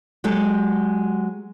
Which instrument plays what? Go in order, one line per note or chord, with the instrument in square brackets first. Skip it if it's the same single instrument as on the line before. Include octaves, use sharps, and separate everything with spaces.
[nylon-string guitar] F#3 G#3 G4 A4